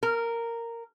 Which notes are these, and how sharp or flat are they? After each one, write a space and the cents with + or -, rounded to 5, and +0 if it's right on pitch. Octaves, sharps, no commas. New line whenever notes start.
A#4 -10